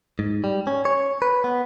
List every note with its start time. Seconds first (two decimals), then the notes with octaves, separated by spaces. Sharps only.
0.19 G#2
0.44 G3
0.67 C#4
0.85 C#5
1.22 B4
1.44 B3